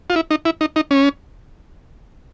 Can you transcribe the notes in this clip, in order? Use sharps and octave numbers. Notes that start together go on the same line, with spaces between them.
F4
E4
D#4
E4
D#4
D#4
C#4